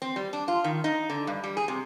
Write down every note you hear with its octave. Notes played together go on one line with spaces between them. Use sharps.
C4
G3
D4
F4
D#3
D#4
D3
G2
G3
G#4
C3